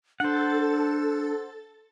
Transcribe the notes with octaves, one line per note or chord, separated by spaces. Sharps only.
D4 A4 C5 F#5 A6